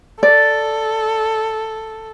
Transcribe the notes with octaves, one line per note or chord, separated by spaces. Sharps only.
A4 D5